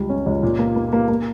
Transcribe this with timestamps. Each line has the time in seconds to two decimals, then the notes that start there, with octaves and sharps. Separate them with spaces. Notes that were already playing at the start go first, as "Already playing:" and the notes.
Already playing: C#2 G3
0.09 C#4
0.26 C#2
0.43 A#2
0.59 A#3
0.76 A#3
0.93 A#3
1.08 A#3